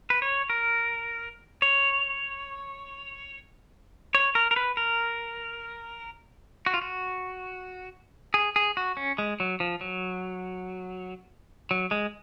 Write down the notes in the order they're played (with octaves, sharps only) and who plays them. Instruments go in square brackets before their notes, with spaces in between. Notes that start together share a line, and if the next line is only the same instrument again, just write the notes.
[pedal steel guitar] B4
C#5
A#4
C#5
C#5
A#4
A#4
B4
A#4
F#4
F4
F#4
G#4
G#4
F#4
C#4
G#3
F#3
F3
F#3
F#3
G#3